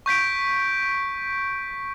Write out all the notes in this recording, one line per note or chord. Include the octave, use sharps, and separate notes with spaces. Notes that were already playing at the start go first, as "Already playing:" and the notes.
C#6 G6 B6 D7